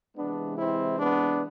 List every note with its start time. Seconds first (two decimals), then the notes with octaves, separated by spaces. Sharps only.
0.16 C3 E3 G#3 B3 D4
0.58 C4 E4
0.98 B3 D4